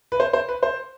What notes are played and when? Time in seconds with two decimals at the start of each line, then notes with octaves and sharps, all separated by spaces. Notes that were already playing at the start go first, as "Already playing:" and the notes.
0.12 B4
0.20 C5
0.33 C5
0.49 B4
0.63 C5